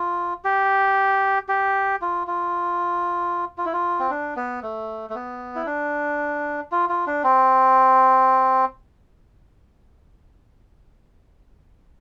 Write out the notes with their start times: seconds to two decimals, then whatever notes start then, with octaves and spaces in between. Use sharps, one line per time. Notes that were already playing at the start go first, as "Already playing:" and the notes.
Already playing: F4
0.45 G4
1.49 G4
2.02 F4
2.27 F4
3.58 F4
3.65 E4
3.73 F4
4.00 C4
4.11 D4
4.36 B3
4.63 A3
5.10 A3
5.15 B3
5.56 E4
5.66 D4
6.72 F4
6.89 F4
7.07 D4
7.24 C4